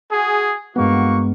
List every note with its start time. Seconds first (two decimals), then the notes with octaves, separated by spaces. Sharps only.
0.12 F#4 G#4
0.76 G2 G#3 A#3 B3 F#4 C#6